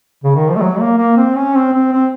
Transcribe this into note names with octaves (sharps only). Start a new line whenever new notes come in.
C#3
D#3
F3
A3
F#3
A#3
A#3
C4
C#4
C4
C4
C4